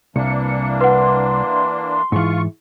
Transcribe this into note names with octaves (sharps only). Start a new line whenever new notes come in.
C2 E3 A#3 D4 C#7
B4 F#5 C6
G#2 E3 F4 C#6